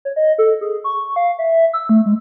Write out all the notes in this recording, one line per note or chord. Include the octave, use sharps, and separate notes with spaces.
C#5
D#5
A4
G#4
C#6
F5
E5
E6
A3
G#3